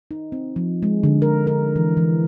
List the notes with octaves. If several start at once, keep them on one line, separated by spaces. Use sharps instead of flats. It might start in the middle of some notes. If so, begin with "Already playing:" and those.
D#4
C4
F3
G#3
D3
A#4
A#4
E3
E3